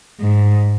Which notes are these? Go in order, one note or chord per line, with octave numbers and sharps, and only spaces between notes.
G#2